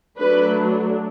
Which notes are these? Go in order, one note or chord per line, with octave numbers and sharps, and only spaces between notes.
F#3 A3 D4 B4